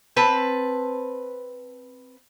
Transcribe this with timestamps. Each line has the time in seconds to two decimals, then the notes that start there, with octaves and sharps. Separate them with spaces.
0.17 C4 B4 A5